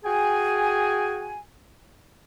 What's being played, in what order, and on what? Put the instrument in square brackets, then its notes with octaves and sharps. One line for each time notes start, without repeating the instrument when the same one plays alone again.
[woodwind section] F#4 G#4 G5 G#5